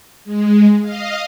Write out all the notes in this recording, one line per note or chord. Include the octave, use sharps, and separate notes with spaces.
G#3
D#5 F5